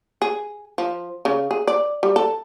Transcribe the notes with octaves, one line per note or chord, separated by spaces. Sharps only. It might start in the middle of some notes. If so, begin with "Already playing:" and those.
G#4
F3
C#3
G#4
D5
G3
A4